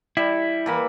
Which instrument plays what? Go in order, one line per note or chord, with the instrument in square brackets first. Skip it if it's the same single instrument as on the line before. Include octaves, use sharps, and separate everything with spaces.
[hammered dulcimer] G3 [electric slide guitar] E4
[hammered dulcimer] E3 A#3 B5